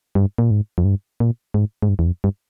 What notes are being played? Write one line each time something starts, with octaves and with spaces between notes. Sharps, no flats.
G2
A#2
G#2
F2
G2
A#2
G#2
G#2
G2
E2
F2
G2